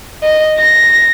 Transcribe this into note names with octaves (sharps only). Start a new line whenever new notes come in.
D#5
A#6